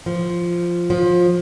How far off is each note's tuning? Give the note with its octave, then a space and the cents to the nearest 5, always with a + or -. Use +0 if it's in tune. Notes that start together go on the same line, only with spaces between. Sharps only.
F3 -5
F3 +20